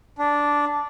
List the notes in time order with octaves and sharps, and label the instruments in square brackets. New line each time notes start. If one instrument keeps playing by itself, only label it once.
[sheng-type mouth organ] D4